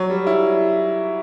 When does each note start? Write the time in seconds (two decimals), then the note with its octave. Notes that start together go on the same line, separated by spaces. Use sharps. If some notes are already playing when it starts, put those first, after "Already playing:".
Already playing: F#3
0.10 G3
0.27 E4